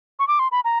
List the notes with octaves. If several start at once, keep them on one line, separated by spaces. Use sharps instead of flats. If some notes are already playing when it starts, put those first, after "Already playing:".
C#6
D6
C6
B5
A#5